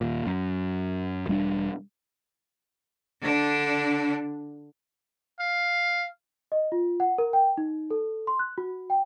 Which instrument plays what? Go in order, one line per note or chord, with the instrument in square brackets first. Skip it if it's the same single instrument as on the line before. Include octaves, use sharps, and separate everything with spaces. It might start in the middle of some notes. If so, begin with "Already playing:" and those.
[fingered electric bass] D#2 A#2
F#2
E1 G3 C#4 D4
[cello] D3 D4
[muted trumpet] F5
[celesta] D#5
F4
F#5
A#4
G5
D#4
A4
C6
F#6
F#4
G5